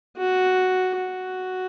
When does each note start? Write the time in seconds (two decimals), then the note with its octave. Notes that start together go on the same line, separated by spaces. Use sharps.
0.17 F#4
0.96 F#4